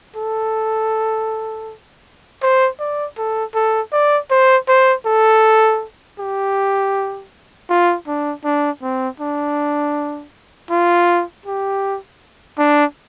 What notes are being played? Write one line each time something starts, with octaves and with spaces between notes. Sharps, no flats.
A4
C5
D5
A4
A4
D5
C5
C5
A4
G4
F4
D4
D4
C4
D4
F4
G4
D4